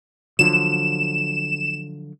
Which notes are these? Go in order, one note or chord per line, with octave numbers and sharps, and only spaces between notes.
D3 F3 F#3 E7